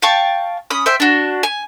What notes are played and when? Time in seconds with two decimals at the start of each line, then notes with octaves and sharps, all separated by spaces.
0.02 F5 G5 A5 C#6
0.70 C#4 B5 D#6
0.86 C5 E5 G5
1.00 D4 F#4
1.43 G#5